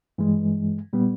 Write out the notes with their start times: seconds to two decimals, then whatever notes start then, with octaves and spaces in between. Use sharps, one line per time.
0.18 G2 E3 G#3
0.93 A#2 G3 B3